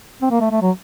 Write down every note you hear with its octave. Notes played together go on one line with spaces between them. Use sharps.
C4
A#3
A3
A3
F#3